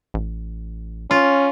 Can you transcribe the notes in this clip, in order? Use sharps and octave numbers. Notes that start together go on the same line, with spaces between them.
A1
C#4 F4